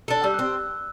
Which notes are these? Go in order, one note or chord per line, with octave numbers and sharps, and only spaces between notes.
D4 A4
G3 E6
F#6
C4